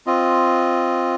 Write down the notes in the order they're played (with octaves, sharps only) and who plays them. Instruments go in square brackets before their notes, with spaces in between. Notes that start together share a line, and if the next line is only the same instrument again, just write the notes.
[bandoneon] C4 F4 D#5